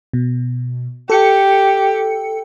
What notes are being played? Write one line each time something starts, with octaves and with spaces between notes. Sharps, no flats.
B2
G4 A4 C#7